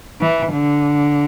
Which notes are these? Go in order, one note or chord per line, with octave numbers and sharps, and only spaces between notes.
E3
D3